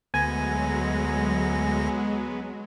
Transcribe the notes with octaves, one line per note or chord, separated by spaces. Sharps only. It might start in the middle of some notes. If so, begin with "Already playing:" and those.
D2 D3 F#3 G#3 B3 G#5 A#6